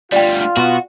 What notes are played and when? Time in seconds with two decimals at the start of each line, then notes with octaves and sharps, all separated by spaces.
0.12 D2 G3 F4 D5 G5
0.57 B2 B3 F#4